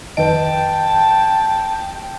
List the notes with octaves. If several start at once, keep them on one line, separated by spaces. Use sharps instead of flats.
F2 D#3 B4 D#5 G5 A5 D7